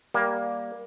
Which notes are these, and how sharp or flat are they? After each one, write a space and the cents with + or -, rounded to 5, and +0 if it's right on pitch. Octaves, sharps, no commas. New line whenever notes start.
G3 +0 A#3 +10